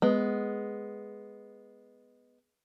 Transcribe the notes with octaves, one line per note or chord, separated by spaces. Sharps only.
G#3 B3